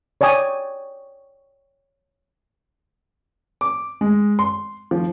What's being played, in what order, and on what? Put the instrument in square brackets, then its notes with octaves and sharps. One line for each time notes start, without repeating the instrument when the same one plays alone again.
[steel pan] C#5 D5 G5 G#5 D#6
[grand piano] D6
G#3
C6
F3